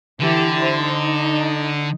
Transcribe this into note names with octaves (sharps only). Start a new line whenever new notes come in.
D3 E3 E4 G4
E4 C5
D#4